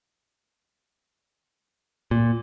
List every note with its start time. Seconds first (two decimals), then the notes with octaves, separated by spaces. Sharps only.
2.11 A#2